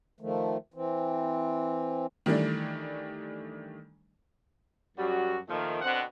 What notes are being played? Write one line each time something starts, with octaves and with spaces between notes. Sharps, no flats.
D#3 F3 A3
E3 C4
D#3 E3 G3 A3 D4
F#2 G3 F#4
A#2 D#3 F3 A3
B2 D3 C4 F#5